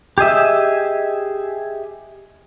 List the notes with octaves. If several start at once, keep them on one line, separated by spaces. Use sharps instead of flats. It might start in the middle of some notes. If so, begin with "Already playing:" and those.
G4 G#4 D#5 E5